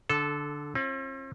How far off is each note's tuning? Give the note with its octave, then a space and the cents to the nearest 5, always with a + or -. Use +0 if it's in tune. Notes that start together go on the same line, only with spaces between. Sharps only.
D3 +0 A4 -15
C4 +45 F4 -25